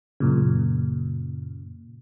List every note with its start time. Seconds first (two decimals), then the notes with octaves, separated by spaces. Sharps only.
0.20 F#2 A#2 C#3